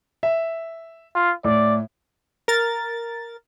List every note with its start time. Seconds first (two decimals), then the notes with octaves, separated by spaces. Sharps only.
0.23 E5
1.15 F4
1.44 A2 D5
2.48 A#4 A6